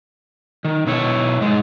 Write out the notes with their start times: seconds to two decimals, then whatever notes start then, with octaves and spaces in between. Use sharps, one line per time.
0.65 D#3
0.87 B2 E4 C#5
1.41 G#2 G#3